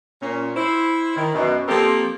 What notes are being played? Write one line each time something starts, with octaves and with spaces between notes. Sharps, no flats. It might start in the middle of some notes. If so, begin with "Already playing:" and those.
A#2 C#4
E4 C5
D#3
F#2 B2
F3 A#3 C4 G4 A4 A#4